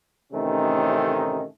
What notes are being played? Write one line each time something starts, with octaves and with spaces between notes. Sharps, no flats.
A1 C3 D#3 A3 C#4 D#4